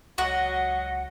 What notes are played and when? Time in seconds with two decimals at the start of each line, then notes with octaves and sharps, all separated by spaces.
0.18 C#2 F#3 F#4 D#5 F#5